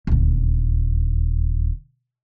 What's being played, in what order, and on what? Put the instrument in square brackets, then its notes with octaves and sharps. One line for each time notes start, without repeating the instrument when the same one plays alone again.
[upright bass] D#1 D2